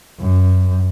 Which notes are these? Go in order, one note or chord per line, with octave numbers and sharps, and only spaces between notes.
F#2